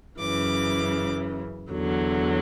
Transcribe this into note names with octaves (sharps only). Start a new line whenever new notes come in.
F#2 C#3 E3 D6
E2 D3 F#3